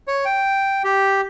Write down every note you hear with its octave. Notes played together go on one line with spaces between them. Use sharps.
C#5
G5
G4